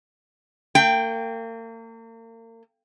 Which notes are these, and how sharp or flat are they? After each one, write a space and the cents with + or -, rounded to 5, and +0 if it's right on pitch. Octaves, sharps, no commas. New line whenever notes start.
A#3 -40 G5 +0